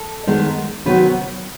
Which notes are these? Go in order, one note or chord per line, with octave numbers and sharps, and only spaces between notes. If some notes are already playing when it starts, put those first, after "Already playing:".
Already playing: A4
D#3 G#3 B3
C3 D#3 F#3 B3 B4